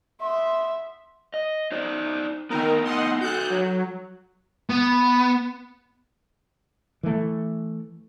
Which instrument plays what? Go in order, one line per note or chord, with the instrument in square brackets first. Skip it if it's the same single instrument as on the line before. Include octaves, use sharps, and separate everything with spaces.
[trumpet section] B3 C6 [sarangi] E5
[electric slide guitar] D#5
D#4 C5 D5
[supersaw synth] D#3 A#4 [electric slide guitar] B3 D#4 G5
[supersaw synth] D#5 F#5 C6
[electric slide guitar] F#4 A4 [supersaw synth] F#6 G6
[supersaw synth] F#3
[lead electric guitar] B3
[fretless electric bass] E3 A3